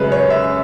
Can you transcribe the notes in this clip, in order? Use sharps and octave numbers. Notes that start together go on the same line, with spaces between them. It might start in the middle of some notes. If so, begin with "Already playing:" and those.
Already playing: F#2 C#3 G#3 B4 C#5
C#5
E5